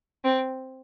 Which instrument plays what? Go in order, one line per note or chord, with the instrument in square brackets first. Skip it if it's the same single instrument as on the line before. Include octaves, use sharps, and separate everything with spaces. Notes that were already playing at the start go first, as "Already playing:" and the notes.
[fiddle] C4